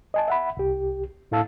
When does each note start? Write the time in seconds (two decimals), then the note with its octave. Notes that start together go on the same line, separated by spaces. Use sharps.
0.14 D#5 G#5 A5
0.28 E5 F#5 B5
0.57 C2 G4
1.31 A2 E4 A4 F5 A5 E6